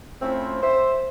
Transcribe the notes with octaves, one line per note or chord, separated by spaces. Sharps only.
A3 C4 C#4 E4 F4 C5
C5 E5